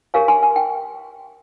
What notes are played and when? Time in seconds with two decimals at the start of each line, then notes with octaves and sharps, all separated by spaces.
0.14 G4 A#4 C#5 F5 G#5
0.28 G#5 C6
0.43 G#5
0.56 G5